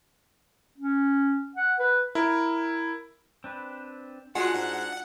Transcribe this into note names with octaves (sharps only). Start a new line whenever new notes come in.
C#4
F#5
B4
E4 A#4
C4 D4 B4
G#3 D4 F4 F#4 F#5
G#2